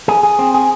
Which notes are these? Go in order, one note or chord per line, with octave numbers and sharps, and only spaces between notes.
G#4
G#4
C4
G#4